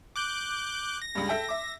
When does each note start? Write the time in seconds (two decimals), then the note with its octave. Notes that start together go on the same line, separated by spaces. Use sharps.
0.16 D6 F#6 G6
1.02 A#6
1.15 C#2 G2
1.29 A4 E5 G5
1.49 E5 D6